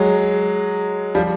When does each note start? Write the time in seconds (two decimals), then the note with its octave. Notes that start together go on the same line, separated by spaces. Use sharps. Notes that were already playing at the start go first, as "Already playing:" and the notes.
Already playing: F#3 G#3
1.15 F3 G3